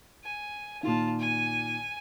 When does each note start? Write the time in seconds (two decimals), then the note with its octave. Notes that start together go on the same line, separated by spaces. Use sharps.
0.24 G#5
0.83 A#2 D#3 F4 A5
1.19 G#5